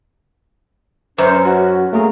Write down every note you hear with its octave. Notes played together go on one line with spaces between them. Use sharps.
F#2 C#4 B4 C5
F#4
A3 A#3 G#4 A#5